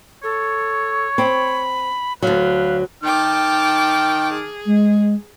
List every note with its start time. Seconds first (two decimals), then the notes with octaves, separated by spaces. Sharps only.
0.23 A4 C#5
1.18 C4 B5
2.22 D2 F#3 B4 F5
3.04 D#3 G5 A5 D6 F6
4.33 G#4
4.66 G#3